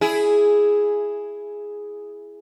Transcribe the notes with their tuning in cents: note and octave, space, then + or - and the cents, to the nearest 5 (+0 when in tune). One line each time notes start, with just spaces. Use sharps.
E4 +5 G#4 +0